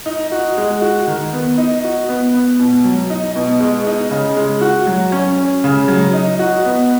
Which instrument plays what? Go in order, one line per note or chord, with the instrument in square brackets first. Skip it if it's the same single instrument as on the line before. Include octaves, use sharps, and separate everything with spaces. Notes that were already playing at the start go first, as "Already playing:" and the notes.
[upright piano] D#4
F#4
G#3
F#4
D#3
B3
D#4
F#4
B3
B3
B2
F#3
D#4
B2
G#3
D#4
C#3
G#3
F#4
F#3
C#4
C#4
C#3
F#3
D#4
F#4
B3